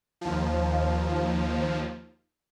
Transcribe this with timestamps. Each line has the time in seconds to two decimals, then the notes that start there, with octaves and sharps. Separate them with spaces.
0.21 D#2 F3